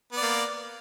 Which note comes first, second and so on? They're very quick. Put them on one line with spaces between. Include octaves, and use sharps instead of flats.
B3 D5 A#3